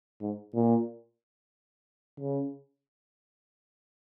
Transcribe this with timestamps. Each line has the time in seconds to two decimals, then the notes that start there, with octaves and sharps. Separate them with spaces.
0.21 G#2
0.55 A#2
2.20 C#3